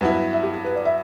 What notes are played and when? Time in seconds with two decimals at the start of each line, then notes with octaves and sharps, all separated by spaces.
0.01 G2 F#3 B3 E4 B4
0.11 B4
0.33 E5
0.43 G4
0.53 G4
0.65 B4
0.75 D5
0.85 E5